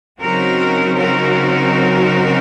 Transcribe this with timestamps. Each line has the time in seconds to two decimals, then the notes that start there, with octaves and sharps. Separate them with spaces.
0.20 C#3 F#3 C4 D#4 F#4 A#4
0.98 F#4 A#4